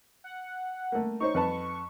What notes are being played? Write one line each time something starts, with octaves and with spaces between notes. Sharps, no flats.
F#5
A3 A#3
D#4 C5 C#5 C#6
F2 B4 A5